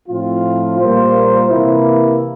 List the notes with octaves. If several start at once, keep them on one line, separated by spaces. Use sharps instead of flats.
A2 F3 C4 F4
A#2 G3 A#3 F4 C5
C3 E3 A#3 E4